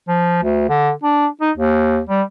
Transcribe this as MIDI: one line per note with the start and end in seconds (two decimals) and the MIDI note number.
0.08 0.42 53
0.43 0.66 38
0.69 0.90 50
1.04 1.27 62
1.41 1.51 63
1.58 2.00 39
2.09 2.22 55